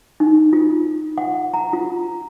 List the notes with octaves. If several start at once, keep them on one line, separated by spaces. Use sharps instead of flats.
D#4
F4
F#5
A#5
F4